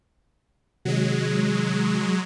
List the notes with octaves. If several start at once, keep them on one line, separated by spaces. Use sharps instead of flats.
C3 D#3 F#3 G#3 G#4